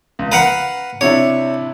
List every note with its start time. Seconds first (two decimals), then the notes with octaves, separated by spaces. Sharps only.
0.19 C#2
0.32 B4 F5 F#5 A#5
1.01 C3 D4 E4 C#5